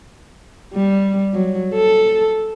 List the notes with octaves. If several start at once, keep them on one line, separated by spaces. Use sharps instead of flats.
G3
F#3
A4